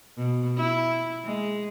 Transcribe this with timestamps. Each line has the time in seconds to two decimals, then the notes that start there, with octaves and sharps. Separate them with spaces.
0.17 B2
0.58 E4
1.25 G#3